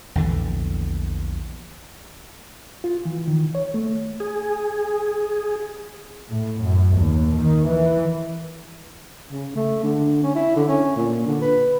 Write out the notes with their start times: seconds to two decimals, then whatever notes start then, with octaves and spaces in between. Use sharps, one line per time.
0.15 A#1 E2 D3 E3
2.84 F4
3.05 E3
3.28 D#3
3.55 C#5
3.74 A3
4.20 G#4
6.30 A2
6.61 F#2
6.97 D#2
7.37 D#3
7.68 E3
9.31 C#3
9.55 A3
9.83 D3
10.23 C#4
10.35 E4
10.56 D3
10.68 C#4
10.96 A#2
11.27 D3
11.41 B4